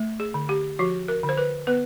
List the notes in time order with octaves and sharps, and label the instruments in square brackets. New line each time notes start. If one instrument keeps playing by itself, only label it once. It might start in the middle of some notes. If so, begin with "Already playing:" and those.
Already playing: [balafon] A3
G#4
D3
G4
F3 F#4
A#4
D3
C5
B4
B3 B4